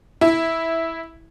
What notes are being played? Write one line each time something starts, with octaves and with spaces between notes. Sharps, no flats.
E4